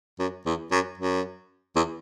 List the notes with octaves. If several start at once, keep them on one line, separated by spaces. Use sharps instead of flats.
F#2
E2
F#2
F#2
E2